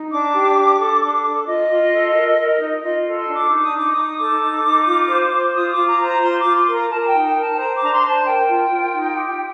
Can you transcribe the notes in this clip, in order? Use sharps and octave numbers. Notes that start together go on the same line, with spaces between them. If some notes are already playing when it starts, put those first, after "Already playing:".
Already playing: D#4
D4 D6
G4
D4
A4
D4
A4
F4 D#5
F4
A4
A#4
A#4
D#4
F4 D#5
A4
C6
D4
D6
D#4
D#6
D#4 D6
D#4 D#6
A4 D6
D#4
D#4
F4
C5
C5
F4 D#6
D6
F4
A#5
C5 A#5
F4 C6
D6
F4
C6
A#4
A#5
A#4 A5
A5
G5
D#4
G5
A#4
A5
C5 A#5
D6
D4 A#5
C6
C5
A5
A#4 G5
F4
F4
D#4
G4